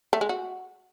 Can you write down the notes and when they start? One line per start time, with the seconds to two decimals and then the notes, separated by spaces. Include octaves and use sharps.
0.13 A3
0.21 G#3
0.29 F#4